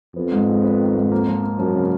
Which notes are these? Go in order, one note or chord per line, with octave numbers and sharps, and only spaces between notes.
F2 B3
G#2
G#3
B3
D#3
G#2
A#3
F3
A#3
F#2 F3
C#3